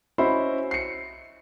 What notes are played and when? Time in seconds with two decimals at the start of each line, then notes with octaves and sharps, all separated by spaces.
0.18 C#4 E4 F#4 C5 D#5 B5
0.71 C7 C#7